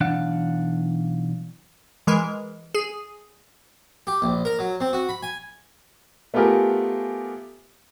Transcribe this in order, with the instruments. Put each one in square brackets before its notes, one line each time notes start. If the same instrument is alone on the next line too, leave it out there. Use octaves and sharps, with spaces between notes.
[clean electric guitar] B1 E3 D4 F5 F#5
[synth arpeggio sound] E3 G#3 A#4
G#4
[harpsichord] G4
A#1
A#4
F#3
C4
F#4
B5
G#5
[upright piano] A3 B3 F4 G4 G#4 A#4